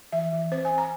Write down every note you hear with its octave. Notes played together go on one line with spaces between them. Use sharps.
E3 E5
E3
C4 C5
G#5
C4
A#5